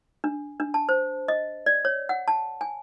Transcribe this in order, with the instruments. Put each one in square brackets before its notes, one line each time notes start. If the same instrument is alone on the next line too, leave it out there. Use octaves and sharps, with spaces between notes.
[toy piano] D4
D4
A5
C5
D#5
D5
C#5
F#5
A5
G#5